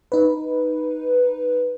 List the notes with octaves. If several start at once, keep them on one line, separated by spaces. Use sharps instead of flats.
D#4 B4